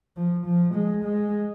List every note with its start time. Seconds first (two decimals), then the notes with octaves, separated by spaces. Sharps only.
0.17 F3
0.46 F3
0.74 G#3
1.03 G#3